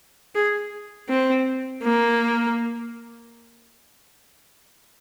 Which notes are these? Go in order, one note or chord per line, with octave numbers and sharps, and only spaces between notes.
G#4
C4
A#3